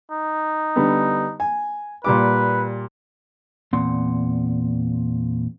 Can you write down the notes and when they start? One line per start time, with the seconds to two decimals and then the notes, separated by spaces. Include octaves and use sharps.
0.12 D#4
0.76 D3 G3 B3
1.40 G#5
2.04 A#2 G3 B4 D6
3.73 E2 A#2 C4 F#5 C6